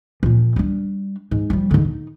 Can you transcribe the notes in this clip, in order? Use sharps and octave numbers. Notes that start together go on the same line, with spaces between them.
A#2 F3
G3 D4
G#2
F3 G3
G#2 D3
D#4